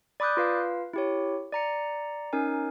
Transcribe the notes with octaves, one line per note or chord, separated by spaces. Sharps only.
D5 B5 D6 D#6 F#6 G6
F4 B4 F5
E4 G4 C#5
D5 A#5 C#7
C#4 D#4 A#4 G#5